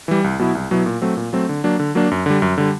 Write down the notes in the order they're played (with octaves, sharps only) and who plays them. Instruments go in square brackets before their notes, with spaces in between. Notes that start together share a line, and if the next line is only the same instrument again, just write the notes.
[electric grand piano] E3 G3
C2
B2 F#3 B3 E4
C2
B2 F#3 B3 E4
A#2
F#3 A3 C4
A#2
F#3 A3 C4
D3
F#3 A#3 D4
D3
F#3 A#3 D4
F#2
D3 G3
F#2
D3 G3